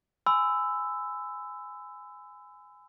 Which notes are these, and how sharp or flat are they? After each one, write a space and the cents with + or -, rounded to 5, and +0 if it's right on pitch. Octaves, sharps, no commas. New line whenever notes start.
G#5 +0 B5 +45 E6 +0